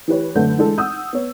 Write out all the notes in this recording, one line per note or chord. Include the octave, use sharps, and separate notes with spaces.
E3 G4 B4 C#5
F#2 D3 A3 A4 B4 G6
E3 G#3 D4 A4
F#5 D#6 E6 G6
B3 C#5